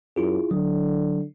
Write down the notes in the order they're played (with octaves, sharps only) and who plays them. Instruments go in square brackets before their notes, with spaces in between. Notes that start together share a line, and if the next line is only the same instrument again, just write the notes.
[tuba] F#2 [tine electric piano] E4 F4 G#4
[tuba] D3 [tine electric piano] F#3